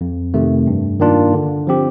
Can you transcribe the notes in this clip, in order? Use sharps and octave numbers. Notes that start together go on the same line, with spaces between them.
F2
C3 D#3 A3
G2
D#3 A#3 D4 F4
D3
F3 C4 G4